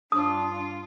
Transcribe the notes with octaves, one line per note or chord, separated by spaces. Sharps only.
G2 D4 F4 D#6